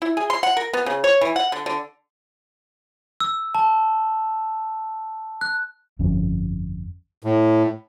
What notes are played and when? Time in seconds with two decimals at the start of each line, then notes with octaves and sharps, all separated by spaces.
0.02 E4
0.17 G#4
0.30 C6
0.43 F#5
0.57 A#4
0.73 B3
0.86 C#3
1.04 C#5
1.21 E3
1.36 F#5
1.52 D3
1.66 D3
3.20 E6
3.55 A5
5.41 F#6
5.99 G1 F2 C#4
7.23 A2